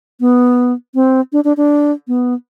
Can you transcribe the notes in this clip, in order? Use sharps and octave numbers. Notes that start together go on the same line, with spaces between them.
B3
C4
D4
D4
D4
B3